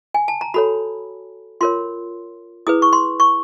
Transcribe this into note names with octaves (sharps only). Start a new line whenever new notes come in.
G#5
A5
A#5
F#4 A4 C#5 B5
F4 A#4 C#5 C6
E4 G#4 B4 D#6
C#6
C6
C#6